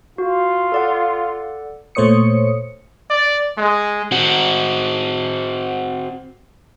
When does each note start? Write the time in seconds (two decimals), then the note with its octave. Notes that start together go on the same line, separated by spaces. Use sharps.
0.18 F4 F#4
0.72 A4 D5 F#5
1.95 A#2 A3 C5 C#5 D#6 C#7
3.10 D5
3.58 G#3
4.12 C4 F#4